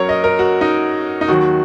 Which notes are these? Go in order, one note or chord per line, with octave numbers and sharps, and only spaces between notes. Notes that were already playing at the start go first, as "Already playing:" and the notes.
Already playing: F#2 F#3 A#4 C#5
D#5
A#4
F#4
D#4
D#4
D#2 D#3 F#3 F#4